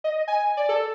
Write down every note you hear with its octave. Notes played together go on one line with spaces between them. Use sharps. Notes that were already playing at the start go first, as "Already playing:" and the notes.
D#5
G#5
D5
A4